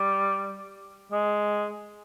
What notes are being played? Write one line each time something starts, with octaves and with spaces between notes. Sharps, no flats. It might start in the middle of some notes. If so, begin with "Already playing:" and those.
Already playing: G3
G#3